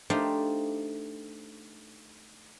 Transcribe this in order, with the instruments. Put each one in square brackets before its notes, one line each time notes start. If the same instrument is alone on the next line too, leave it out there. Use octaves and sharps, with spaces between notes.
[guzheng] A3 D4 D#4 G4 C5 F5